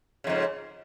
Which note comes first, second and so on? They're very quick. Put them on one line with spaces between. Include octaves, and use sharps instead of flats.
C#3 F2 G#2